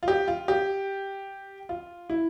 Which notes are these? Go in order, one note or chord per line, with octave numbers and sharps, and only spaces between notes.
F4
G4
F4
G4
F4
E4